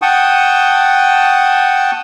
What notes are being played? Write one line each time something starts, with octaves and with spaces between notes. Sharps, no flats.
F#5 G5 A5 C#6 D#6